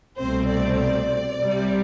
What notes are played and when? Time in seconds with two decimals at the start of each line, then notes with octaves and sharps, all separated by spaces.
0.20 C2 B2 A3 C4 C5
0.50 D5
0.80 D5
1.39 C2 C3 G3